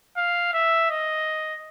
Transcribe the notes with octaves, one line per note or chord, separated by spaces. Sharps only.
F5
E5
D#5